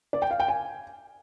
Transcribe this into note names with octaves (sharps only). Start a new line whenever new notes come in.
D5
G5
F5
G5
G#5